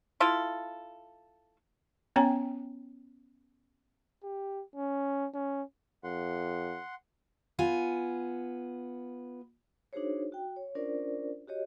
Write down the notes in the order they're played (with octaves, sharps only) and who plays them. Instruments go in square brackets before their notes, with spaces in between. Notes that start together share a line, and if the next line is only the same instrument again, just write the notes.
[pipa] E4 F4 A4
[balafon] B3 C#4 C#5 G5 G#5 A#5
[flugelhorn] G4
C#4
C#4
[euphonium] F2 [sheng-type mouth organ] F#5 C6
[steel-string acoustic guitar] B3 F4 G#5
[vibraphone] D4 D#4 F#4 G#4 C5 C#5
F#4 G5
C#5
C#4 D4 F4 A#4 C5 D5
F#4 G4 C#5 D#5